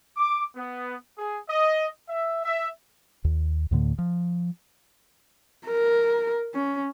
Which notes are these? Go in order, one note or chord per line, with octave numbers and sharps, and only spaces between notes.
D6
B3
G#4
D#5
E5
E5
D#2
D2 A2 D3 A3
F3
A#4
C#4